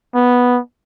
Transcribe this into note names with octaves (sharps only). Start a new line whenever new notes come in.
B3